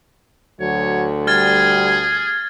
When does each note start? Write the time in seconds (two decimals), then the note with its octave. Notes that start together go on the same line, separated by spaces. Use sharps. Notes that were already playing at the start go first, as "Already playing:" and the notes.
0.61 D2 F#3 C#5
1.27 G3 G#4 F6 G#6 A6